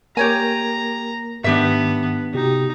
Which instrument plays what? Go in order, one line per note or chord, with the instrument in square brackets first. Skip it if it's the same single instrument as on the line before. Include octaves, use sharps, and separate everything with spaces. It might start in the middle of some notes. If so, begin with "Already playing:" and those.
[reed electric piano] A#3 A#4 [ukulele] G4 C#5 G#5 [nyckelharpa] A#5
[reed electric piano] G#2 D#3 [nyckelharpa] B3 [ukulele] D4 G4 E5
[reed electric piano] C3 F#4 G4 [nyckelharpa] D#4